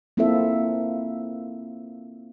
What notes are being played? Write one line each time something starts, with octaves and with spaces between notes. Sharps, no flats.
A#3 C4 E4 F4 A4 E5